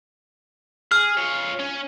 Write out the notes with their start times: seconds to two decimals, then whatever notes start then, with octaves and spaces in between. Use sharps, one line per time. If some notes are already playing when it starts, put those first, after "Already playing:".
0.92 G#4 F6
1.17 F4 C#5
1.60 C#4